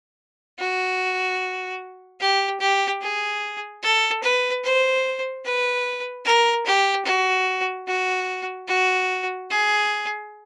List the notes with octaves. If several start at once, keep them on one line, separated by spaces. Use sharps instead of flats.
F#4
G4
G4
G#4
A4
B4
C5
B4
A#4
G4
F#4
F#4
F#4
G#4